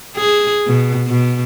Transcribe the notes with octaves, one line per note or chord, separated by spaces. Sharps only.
G#4
B2
B2